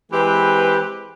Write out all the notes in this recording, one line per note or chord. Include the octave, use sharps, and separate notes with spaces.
E3 G#3 C4 G4 B4